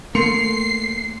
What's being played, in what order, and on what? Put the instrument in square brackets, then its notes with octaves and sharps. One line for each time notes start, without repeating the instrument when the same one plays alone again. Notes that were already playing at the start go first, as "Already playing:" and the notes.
[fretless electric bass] A3 A#3 [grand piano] C6 C#7 F7 [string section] C7